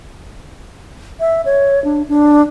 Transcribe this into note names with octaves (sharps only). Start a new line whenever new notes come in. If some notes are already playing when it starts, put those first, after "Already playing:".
E5
C#5
D4
D4